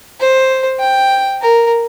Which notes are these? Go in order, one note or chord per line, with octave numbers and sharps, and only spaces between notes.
C5
G5
A#4